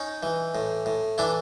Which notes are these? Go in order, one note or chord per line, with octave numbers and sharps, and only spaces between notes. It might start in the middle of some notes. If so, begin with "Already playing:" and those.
Already playing: C#4 D#4
E3
A2
A2
E3 D4 E4